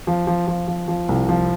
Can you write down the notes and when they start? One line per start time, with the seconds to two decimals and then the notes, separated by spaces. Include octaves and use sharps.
0.07 F3
0.27 F3
0.47 F3
0.68 F3
0.88 F3
1.09 C2
1.29 F3